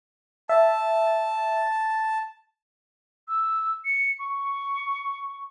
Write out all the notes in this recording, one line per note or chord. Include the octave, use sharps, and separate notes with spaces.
E5 A5
E6
C#7
C#6